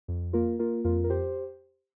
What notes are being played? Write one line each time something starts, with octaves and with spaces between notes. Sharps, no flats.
F2
A#3 F4 A#4
A#3 F4 A#4
F2 F4 A#4
A#4
G4 C5